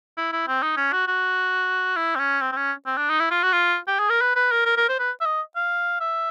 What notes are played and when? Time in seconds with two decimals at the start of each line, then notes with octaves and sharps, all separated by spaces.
0.17 E4
0.32 E4
0.48 C4
0.63 D#4
0.77 C#4
0.93 F#4
1.08 F#4
1.96 E4
2.15 C4
2.19 C#4
2.41 C4
2.52 C4
2.57 C#4
2.86 C4
2.97 D4
3.09 D#4
3.20 E4
3.31 F4
3.43 F#4
3.53 F4
3.88 G4
3.99 G#4
4.10 A#4
4.21 B4
4.36 B4
4.52 A#4
4.66 A#4
4.77 A#4
4.89 C5
4.99 B4
5.21 E5
5.26 D#5
5.56 F5
6.00 E5